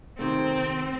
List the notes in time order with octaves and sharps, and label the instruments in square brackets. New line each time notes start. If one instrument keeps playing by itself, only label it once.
[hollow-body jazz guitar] C3 D#3 A3 [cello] C4